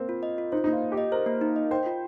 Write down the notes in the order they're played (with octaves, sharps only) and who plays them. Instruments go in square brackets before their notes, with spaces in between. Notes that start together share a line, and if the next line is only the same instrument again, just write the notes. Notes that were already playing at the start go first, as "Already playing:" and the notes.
Already playing: [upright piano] A#3 C4
[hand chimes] F4
D#5
F4
[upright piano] D#4 [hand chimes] C5
[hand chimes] A#3 [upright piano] D#4
[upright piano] F4
[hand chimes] D#4
[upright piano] G4
[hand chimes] D#5
[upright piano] A#4 [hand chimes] C5
[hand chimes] A#3
D#4
D#5
[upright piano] C5 [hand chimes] G5
[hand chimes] F4